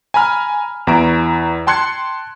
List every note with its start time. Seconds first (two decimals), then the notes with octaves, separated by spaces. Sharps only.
0.14 G#5 A#5 B5 F6
0.87 E2 E4 A#5 D7
1.67 G5 A5 C6 F#6 G#6 C#7